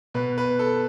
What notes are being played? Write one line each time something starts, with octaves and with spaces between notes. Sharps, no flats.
B2 B4
B4
A4